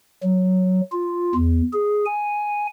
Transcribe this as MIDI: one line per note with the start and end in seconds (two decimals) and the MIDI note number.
0.23 0.81 54
0.92 1.34 65
1.35 1.61 40
1.73 2.05 68
2.06 2.67 80